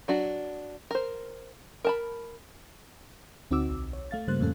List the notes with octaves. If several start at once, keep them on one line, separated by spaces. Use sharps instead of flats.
F#3 D4 F#4
A#4 C5
A#4 A5 B5
D2 C4 D#4 F#4 D6 E6
B1
C#5
A3 F5 A6
G2 C#3 G3 A#3 C5 F#6
F2 A2 C#4 A4